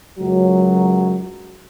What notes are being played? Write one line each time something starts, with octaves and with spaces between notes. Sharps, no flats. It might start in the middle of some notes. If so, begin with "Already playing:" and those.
C#2 F#2 F#3